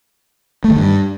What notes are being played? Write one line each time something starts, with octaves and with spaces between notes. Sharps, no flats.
A3
D#3
G2